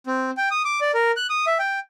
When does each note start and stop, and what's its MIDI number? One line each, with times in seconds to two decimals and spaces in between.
0.07 0.31 60
0.37 0.49 79
0.51 0.62 87
0.65 0.80 86
0.81 0.91 74
0.94 1.12 70
1.17 1.27 90
1.30 1.45 87
1.47 1.58 76
1.59 1.79 79